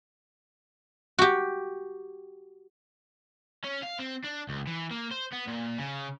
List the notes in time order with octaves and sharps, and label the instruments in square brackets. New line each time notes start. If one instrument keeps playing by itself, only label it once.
[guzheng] F#4 G4
[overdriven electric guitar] C#4
F5
C4
D4
C#2
E3
A#3
C5
B3
A#2
C#3